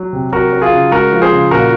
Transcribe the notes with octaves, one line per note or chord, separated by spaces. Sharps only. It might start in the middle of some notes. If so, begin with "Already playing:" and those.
Already playing: F#3
C3
F#3 F#4 A#4
F#3
F4 G#4
C#3
G#3 F#4 A#4
F3
G#4 C5
C#3
A#2 F#4 A#4